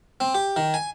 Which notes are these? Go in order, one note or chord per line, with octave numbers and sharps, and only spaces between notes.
C4
G4
D#3
G#5